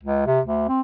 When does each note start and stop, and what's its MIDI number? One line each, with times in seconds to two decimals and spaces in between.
0.03 0.25 37
0.26 0.40 48
0.45 0.65 38
0.68 0.81 60